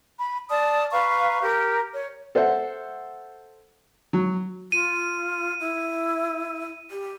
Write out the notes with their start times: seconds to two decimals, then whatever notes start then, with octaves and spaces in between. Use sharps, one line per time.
0.18 B5
0.48 D5 A5 D#6 F6
0.91 B4 F5 A#5 C#6
1.42 G4 A#4
1.93 C#5
2.35 A4 C5 E5 F#5
4.13 F#3
4.72 F4 D#7
5.60 E4
6.91 G4